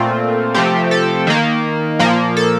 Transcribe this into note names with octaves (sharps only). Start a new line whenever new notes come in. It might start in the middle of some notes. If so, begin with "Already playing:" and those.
Already playing: A#2 A3 C4 F4
C3 F3 A3 C4 G4
A4
D#3 A#3
A#2 F3 A#3
A4